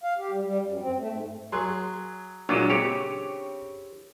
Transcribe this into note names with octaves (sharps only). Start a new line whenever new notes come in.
F5
G4
G3
G3
F#2
C4
A3
G#2
F#3 G#4 C6
A#2 F#3 G#3 D4
C#3 C4 G4 C#5